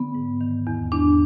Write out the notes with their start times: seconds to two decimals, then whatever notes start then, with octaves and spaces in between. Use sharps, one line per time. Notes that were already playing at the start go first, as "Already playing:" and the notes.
Already playing: D3 B3
0.15 G#2
0.41 D#3
0.67 E2
0.92 E2 D4